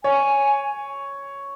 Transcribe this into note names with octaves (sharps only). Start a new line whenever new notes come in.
C#5 G#5